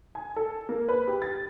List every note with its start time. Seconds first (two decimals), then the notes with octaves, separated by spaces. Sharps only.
0.15 G#5
0.36 A4
0.69 A#3
0.89 B4
1.07 G4
1.22 A6